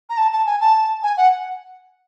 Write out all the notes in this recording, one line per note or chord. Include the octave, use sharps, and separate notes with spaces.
A#5
A5
A5
G#5
A5
G#5
F#5